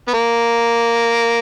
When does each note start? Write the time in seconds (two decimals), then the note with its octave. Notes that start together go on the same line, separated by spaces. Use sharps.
0.08 B3
0.14 A#3